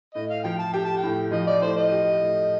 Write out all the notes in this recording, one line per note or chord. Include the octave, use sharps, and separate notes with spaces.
A2 D#5
F5
F3 G5
A5
G4 G5
A5
G5
A2
F3 D#5
D5
A2 C5
D#5
G4
A2